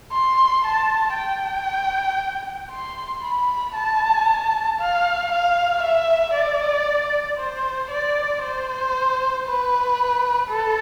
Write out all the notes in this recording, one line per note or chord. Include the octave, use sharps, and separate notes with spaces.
C6
A5
G5
C6
B5
A5
F5
F5
E5
D5
C5
D5
C5
B4
A4